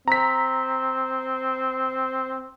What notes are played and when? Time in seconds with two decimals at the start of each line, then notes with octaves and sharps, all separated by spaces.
0.08 C4 A#5 B6